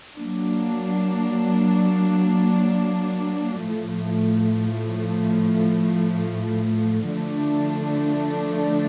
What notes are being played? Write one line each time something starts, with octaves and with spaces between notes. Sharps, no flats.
F#3 A#3 D4
A2 F3 A3
D3 F3 A3 D4